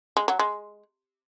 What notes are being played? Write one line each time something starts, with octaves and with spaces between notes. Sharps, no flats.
G#3
F#3
G#3